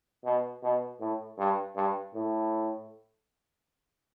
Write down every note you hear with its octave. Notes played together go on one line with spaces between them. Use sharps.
B2
B2
A2
G2
G2
A2